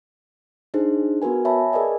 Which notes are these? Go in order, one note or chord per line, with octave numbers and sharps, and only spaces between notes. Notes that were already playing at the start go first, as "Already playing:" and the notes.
D4 D#4 G#4 C5
B3 F#4 A#4 B4 G#5
C#5 E5 G#5 A5 B5
G#4 A#4 B4 D5 D#5 G#5